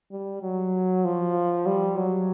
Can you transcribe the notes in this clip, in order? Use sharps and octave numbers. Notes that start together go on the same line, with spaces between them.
G3
F#3
F3
G3
F#3